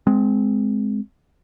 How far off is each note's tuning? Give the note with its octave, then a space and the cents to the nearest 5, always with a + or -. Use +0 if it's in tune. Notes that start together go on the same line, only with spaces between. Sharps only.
G#3 +10 C4 -15